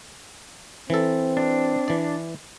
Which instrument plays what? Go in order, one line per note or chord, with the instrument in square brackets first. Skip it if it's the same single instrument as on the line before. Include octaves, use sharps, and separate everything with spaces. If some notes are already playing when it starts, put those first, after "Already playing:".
[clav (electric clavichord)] E3 A4 [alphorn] C4
[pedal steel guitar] D4
[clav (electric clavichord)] E3 D5